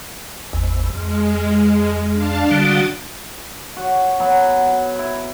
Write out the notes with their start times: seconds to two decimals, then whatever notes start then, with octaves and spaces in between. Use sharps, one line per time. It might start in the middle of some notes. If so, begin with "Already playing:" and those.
0.53 G#1 E2
0.95 F2 G#3
2.12 D4 F5 A5
2.51 D3 G3 F#4 D#6 A6
3.77 F#4 C#5
4.20 F#3 B3
4.99 E4